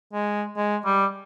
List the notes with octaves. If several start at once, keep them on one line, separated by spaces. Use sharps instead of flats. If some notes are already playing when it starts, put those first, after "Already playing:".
G#3
G#3
G3